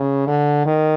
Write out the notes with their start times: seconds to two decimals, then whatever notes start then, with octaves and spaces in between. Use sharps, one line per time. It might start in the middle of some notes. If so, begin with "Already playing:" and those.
Already playing: C#3
0.27 D3
0.66 D#3